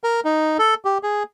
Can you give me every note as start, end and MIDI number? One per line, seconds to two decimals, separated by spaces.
0.04 0.20 70
0.25 0.57 63
0.59 0.74 69
0.85 0.98 67
1.03 1.23 68